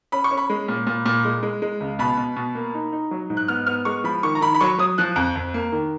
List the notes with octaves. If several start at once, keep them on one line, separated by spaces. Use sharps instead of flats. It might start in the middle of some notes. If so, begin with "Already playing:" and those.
C#4 B5
C#6
C#4
B5
G#3
A#2
A#2
A#2
G#3
G#3
G#3
C#2
B2 B5
B2
B2
A#3
D#4
D#4
F#3
G#2
F#6
B3 F6
B3 F6
G#3 C#6
F3 B5
D#3 C#6
A#5
D#3 B5
B5
F#3 C#6
F#3 D#6
F3 F#6
F2
F2
A#3
D#3